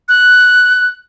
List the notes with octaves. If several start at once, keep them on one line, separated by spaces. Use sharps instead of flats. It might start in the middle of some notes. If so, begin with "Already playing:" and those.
F#6